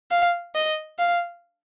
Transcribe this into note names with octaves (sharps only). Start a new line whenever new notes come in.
F5
D#5
F5